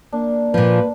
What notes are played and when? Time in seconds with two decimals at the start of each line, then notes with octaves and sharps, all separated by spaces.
0.13 A#3 D4
0.54 A#2 F3 B4